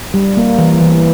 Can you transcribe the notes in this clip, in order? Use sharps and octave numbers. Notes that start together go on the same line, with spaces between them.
G3
A#3
E3
E3